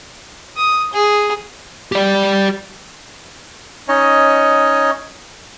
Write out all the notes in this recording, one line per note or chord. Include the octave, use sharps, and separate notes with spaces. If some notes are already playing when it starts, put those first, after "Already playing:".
D#6
G#4
G4 D5
C#4 D#4 C#5 D#5